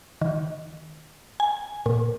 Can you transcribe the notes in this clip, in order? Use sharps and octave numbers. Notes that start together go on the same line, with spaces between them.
D#3
G#5
A#2